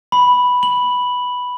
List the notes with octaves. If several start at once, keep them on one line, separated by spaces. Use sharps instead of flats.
B5
F#7